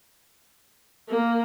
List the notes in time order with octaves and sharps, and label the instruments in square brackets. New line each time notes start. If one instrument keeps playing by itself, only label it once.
[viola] A#3